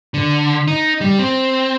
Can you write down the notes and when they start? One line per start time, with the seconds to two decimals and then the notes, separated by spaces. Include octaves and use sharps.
0.14 D3
0.67 D#4
1.01 G3
1.19 C4